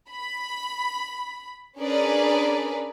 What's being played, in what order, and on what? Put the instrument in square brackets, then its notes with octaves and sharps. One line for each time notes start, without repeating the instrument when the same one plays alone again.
[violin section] B5
C#4 D4 G#4 A#4 B4 D5